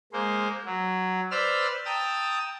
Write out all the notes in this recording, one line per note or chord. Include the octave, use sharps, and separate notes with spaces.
G#3 A#3 C5
F#3
B4 C5 D5 E6 F6
G5 A5 A#5 D#6 E6